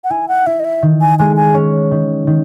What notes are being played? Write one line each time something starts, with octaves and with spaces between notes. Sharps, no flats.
F#5
E4 G#5
F#5
E4 E5
D#5
E5
D#3
G#5
G#3 G#5
G#5
C#4
D#3
D#3